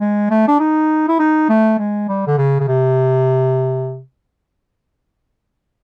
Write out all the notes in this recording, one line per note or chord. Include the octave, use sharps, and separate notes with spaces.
G#3
A3
D4
D#4
E4
D#4
A3
G#3
G3
D3
C#3
C#3
C3